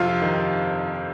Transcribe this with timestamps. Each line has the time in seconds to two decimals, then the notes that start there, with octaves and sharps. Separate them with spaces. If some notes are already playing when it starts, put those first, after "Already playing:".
Already playing: F2 C3 F4 F5
0.22 D#3